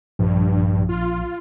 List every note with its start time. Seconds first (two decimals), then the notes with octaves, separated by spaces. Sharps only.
0.19 A#1 G2
0.89 F4